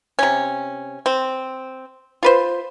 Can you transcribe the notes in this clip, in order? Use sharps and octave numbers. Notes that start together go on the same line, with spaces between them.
C3 C#4
C4
F4 B4 C5